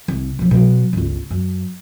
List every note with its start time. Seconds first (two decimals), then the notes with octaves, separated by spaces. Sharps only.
0.08 C2
0.39 E1 F3
0.51 B2 F#3
0.93 G1 C#2
1.31 F#2